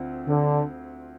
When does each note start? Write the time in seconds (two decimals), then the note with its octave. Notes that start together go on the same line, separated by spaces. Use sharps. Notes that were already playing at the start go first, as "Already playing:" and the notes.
Already playing: D2 C4 F4
0.28 D3